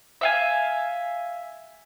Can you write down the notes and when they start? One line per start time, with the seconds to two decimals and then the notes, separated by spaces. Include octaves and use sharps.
0.21 E5 F5 G#5